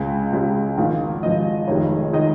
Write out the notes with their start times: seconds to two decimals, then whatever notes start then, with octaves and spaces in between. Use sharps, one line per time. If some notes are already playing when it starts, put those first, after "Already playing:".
Already playing: C#2 C#3 G#3 G#5
0.33 C#2 C#3 G#3
0.77 G#1 G#2 F3 F5
1.23 G#1 G#2 F3 D#5
1.68 F1 F2 D#3 G#3 C#5
2.13 D#3 G#3 D#5